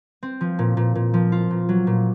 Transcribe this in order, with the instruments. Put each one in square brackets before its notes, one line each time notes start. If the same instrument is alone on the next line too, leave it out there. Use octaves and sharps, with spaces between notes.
[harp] C4
F3
A#2
A#2
A#2
F3
F4
A#2
F#3
A#2